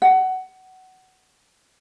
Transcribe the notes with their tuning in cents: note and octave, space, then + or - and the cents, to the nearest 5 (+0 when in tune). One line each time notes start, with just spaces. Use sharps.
F#5 +15